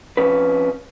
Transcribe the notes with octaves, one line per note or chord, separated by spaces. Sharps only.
F2 C#4 B4